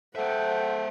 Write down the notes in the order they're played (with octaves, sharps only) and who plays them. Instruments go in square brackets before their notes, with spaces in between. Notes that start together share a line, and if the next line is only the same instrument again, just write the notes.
[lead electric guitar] G#3 E5 [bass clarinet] A4 [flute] C5 [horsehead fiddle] F#5 G5